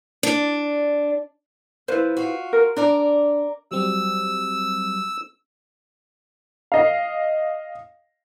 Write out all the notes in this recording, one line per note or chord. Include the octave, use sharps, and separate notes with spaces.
D4
F3 E4 B4 C5
F4 F#4
A#4
D4 A#4 D5 A#5
F#3 G3 C4 E6
D#5 F5